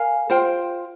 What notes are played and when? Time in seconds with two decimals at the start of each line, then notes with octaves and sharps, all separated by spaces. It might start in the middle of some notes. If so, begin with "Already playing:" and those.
Already playing: A#4 F5 G#5
0.30 F4 C5 G5